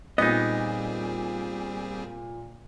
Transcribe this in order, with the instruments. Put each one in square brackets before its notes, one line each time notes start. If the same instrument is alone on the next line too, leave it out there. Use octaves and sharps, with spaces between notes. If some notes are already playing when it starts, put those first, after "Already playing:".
[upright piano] A#2 [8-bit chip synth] G3 C4 G#4 [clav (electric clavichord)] B3 D#4 [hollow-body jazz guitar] D#5